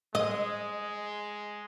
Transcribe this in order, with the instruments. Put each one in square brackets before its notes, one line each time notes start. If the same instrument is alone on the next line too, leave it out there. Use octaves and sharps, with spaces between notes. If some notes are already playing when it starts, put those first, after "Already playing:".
[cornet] G#3 [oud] D#5